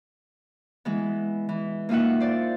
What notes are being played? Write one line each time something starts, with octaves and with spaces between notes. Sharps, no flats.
E3 G#3 B3
E3
A#3 D#4 F4 E5 F#5
C5 D5